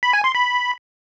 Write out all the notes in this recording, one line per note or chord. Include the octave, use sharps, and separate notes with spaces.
B5
G#5
C6
B5